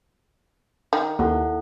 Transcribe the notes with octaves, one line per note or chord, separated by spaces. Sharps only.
D#3
D#2 E4 A4 F#5